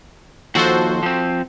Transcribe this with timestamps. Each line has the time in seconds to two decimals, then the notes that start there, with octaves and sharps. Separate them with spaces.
0.55 D#2 F3 F#4 A4 C5
1.03 F3 C4